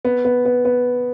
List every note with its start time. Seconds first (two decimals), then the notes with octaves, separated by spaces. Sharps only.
0.05 B3
0.25 B3
0.45 B3
0.65 B3